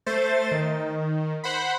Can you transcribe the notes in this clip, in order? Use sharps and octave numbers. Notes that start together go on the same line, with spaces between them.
A3 C5 A6
D#3
C5 F#5 B5